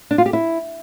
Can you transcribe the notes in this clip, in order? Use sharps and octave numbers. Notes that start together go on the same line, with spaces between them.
D4
F4
G4
E4